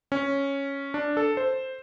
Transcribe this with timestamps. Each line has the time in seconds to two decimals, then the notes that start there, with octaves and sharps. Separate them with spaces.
0.12 C#4
0.94 D4
1.17 A4
1.37 C5